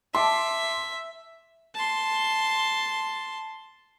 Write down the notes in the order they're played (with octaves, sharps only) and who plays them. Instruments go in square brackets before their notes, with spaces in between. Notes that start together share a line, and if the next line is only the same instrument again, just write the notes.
[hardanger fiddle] E5 [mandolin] A5 [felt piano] C6 D6
[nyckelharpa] A5 C6